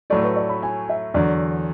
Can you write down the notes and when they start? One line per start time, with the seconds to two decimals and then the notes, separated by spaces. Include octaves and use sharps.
0.10 A2 F#3 A3 D5
0.23 B4
0.36 D5
0.49 B5
0.63 G#5
0.89 E5
1.14 E2 D3 F#3 D5